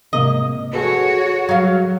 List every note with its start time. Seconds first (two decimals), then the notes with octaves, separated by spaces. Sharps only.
0.13 G#2 C3 A#3 D#5
0.73 F#4 G#4 A4 B4 C#5
1.49 F#3 F5